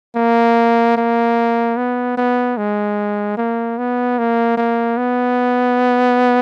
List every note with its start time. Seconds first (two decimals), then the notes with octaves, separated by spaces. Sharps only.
0.16 A#3
0.97 A#3
1.77 B3
2.18 B3
2.57 G#3
3.37 A#3
3.78 B3
4.18 A#3
4.57 A#3
4.97 B3